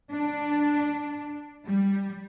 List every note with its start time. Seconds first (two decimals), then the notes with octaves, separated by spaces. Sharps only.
0.13 D4
1.65 G3